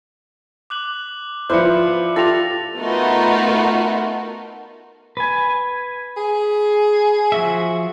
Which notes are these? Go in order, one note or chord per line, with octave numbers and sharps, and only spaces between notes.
D6 F#6 F#7
F3 E4 B4 C5 D5 F#6 C#7
F4 G4 A4 A6 A#6 F7
A3 B3 D#4 F4 F#4 A#4
B4 G#5
G#4
F3 F#4 E5